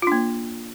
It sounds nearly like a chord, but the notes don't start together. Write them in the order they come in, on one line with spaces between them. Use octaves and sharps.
F4 D4 A#3